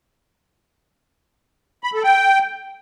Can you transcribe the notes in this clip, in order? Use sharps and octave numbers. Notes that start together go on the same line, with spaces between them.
B5
A4
G5